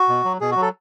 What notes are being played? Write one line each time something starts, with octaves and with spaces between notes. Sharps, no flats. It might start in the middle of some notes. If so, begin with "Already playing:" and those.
Already playing: F#4
B2
F#3
B2 G#4
F#4
F#3
A4